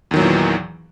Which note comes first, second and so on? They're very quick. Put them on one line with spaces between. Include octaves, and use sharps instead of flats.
E2 D#3 F#3 A#2 E3